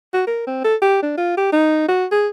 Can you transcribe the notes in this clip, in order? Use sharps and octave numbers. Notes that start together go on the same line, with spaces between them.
F#4
A#4
C4
A4
G4
D4
F4
G4
D#4
F#4
G#4